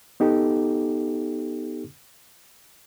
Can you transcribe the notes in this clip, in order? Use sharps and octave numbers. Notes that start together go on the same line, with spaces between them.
B3 D#4 G4 A4